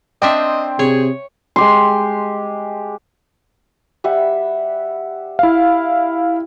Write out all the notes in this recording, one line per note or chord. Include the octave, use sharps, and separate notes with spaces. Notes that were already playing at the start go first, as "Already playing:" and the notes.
C4 D4 D#5 E5 G5 C6
C3 G#4 C#5
G#3 G4 C6
G3 E5 F#5
E4 F5